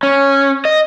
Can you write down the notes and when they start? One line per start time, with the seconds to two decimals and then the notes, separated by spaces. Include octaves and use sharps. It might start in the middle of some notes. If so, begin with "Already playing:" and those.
0.03 C#4
0.65 D#5